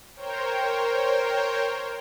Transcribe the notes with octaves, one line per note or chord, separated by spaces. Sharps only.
A#4 C5 C#5 G5